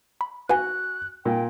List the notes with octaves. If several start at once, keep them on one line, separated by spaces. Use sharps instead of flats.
B5
F#4 B4 F#5 G#5 F#6
A#2 G5